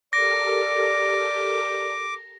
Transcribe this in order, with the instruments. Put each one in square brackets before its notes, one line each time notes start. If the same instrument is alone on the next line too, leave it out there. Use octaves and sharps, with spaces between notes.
[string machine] G4 A4 A#4 [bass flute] D5 [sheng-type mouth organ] D6 [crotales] A#6